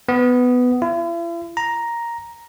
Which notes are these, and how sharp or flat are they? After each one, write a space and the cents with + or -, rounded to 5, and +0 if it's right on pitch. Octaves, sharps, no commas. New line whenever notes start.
B3 +10
E4 +45
A#5 +5